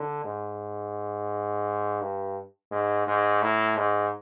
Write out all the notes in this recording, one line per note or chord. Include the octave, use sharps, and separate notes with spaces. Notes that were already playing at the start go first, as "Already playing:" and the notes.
Already playing: D3
G#2
G2
G#2
G#2
A2
G#2